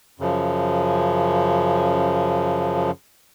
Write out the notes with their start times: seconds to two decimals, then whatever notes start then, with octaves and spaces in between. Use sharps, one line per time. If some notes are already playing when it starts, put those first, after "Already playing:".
0.20 F#2 C#3 F3